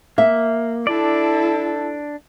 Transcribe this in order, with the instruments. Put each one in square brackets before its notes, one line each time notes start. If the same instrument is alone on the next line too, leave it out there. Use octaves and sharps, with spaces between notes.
[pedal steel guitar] A#3 [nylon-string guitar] E5
[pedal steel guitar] D4 D5 [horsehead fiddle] E4 A4